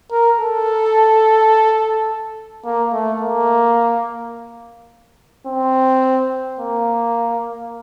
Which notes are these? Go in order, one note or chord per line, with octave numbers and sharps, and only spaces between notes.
A#4
A4
A#3
A3
A#3
C4
A#3